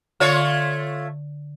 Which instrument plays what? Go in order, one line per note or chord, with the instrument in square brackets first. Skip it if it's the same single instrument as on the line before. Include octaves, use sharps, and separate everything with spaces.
[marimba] D3 [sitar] A3 F4 C#5